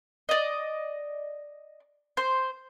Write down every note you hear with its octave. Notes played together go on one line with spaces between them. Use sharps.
D5 D#5
C5